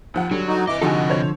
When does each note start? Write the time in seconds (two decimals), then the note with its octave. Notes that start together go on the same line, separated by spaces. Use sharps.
0.14 D#2 F3 F#5
0.31 D3 F#3 G3
0.48 D#4 F#4
0.67 C3 E3 E4 D#5 D6
0.82 D3 F3 D#4 F#4 G4 A4 G#5
1.10 C5 C#5